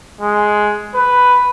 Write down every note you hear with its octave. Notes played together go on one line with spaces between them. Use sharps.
G#3
B4